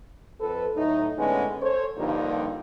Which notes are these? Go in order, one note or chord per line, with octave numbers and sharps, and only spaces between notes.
F2 A4 B4
A2 F#3 A3 D#4
A2 D3 G#3 B3 C#4
A4 C5 C#5
G2 D3 F3 G3 A#3 D#4